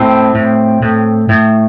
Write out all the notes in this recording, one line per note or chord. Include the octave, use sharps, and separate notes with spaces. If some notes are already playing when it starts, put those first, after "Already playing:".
Already playing: A2 C4
A2
A2
A2